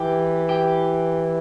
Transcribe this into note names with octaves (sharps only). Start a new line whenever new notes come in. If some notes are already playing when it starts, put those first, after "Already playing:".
Already playing: E3 G4
G4